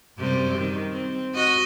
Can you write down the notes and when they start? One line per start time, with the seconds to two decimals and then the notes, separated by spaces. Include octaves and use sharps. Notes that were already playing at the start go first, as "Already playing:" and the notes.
0.18 F#2 C3 G3
0.59 D#3
0.90 C4
1.34 F#4 D#5